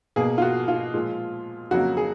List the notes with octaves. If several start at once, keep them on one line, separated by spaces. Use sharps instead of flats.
B2 A#3 G#4
F4
F#4
F4
A#2 F3 G#3
F2 C#3 F#3 A#3 F#4
G#4